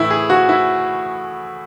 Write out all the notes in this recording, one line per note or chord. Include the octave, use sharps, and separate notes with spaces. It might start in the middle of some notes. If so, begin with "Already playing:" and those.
Already playing: A2 E3 E4
G#4
F#4
E4